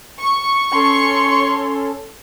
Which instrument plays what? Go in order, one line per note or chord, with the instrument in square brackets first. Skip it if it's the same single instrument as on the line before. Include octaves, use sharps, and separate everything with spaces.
[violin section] C#6
[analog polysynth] C#4 A4 [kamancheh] C#5 C6